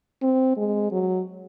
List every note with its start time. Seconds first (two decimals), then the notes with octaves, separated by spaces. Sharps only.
0.22 C4
0.57 G#3
0.91 F#3